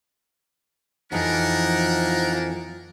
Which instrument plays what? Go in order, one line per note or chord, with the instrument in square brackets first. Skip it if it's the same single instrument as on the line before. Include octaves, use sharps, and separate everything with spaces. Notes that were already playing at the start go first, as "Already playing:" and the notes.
[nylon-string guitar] F2 E3 [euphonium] F3 [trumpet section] A#3 D4 A#4 [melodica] D#4 F#5